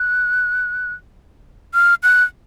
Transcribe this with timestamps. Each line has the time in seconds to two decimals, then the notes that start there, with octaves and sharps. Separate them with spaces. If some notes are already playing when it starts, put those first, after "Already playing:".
Already playing: F#6
1.74 F6
2.03 F#6